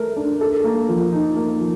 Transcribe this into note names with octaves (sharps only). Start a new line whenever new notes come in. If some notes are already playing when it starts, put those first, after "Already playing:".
Already playing: A3 A#4
D4
A4
A#3
F3
D#4
A#3
F3